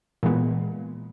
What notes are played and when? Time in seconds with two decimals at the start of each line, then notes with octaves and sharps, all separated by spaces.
0.23 A#2 E3 G#3 B3